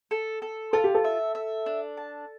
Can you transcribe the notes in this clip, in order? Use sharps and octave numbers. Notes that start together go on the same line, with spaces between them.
A4
A4
F4 A4
G4
A4
E5
E5
D4
A5